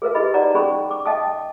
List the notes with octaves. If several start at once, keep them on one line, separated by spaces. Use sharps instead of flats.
G#4 A#4 B4 F5
E4 G4 G#4 D#5 B5
D#4 D5 F#5 A#5
C#4 G#4 B5 C#6
D6
D#5 F5 G5 A5 D#6